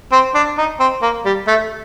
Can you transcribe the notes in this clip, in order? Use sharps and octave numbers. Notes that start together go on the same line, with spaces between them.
C4
D4
D#4
C4
A#3
G3
A3